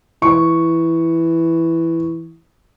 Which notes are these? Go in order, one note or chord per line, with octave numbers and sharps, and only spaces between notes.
E3 C#6